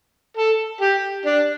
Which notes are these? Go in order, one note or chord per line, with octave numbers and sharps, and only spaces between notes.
A4
G4
D4